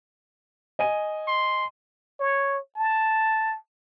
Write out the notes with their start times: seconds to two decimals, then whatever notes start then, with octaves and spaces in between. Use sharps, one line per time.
0.79 D#5 G#5 D#7
1.27 C6
2.20 C#5
2.76 A5